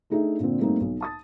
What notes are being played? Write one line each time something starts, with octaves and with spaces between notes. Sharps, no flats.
A3 D4 D#4 G#4 A4 E5
A#2 D3 C4
G3 A3 A#3 C4 D#4
B1
A5 D#6 A6